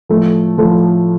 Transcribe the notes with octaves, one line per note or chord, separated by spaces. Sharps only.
A2 F3 A3
A2 F3 A3